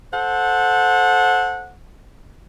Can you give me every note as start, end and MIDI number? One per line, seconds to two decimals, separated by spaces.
0.13 1.72 69
0.13 1.72 72
0.13 1.72 78